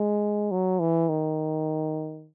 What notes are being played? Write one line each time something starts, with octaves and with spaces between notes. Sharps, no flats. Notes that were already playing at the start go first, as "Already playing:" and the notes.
Already playing: G#3
F#3
E3
D#3